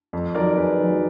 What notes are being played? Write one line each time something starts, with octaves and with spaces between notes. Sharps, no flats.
F2
D#3 F#3 A#4 D5
F2 G#4 B4
D#3 F#3